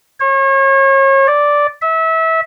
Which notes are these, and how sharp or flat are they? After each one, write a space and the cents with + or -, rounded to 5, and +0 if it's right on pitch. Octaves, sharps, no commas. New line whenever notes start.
C#5 -35
D5 -5
E5 -25